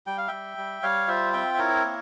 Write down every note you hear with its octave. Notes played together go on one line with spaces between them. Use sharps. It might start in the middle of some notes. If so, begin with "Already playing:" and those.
G3 G5
F5
G3 E5 G5
G3
G3 C#5 F5
F4 C5 E5
C4 E5 G5
E5
E4 A#4 C#5
A#3